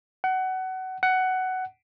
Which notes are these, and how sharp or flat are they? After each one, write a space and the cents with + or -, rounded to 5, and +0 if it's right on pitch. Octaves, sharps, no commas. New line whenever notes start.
F#5 +20
F#5 +10